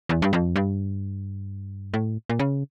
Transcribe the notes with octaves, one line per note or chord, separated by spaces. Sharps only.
E2
G2
F2
G2
A2
A#2
C#3